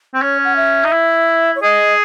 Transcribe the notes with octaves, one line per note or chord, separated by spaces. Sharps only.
C4
C#4 C#5
F#5
E5
D#4
E4
C#5
G#4 D#5